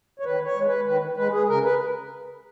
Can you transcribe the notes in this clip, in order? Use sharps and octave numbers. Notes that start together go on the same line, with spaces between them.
C#5
D#3 B4
C#5
G#3
B4
D#3 B4
G#3 B4
G#4
C#3 A#4
B4